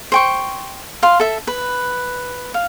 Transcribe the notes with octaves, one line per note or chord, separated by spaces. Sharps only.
C5 G5 C#6
F5 C6
A4 E5
B4
F5